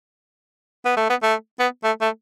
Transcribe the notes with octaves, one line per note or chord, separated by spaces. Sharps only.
B3
A3
B3
A3
B3
A3
A3